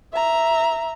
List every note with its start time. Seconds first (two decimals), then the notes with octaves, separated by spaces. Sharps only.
0.12 E5 A#5